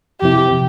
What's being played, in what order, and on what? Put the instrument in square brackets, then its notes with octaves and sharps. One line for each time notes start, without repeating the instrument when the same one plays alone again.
[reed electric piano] F2 C3 F3 C4 E4 [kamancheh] G4
[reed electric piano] C3 F3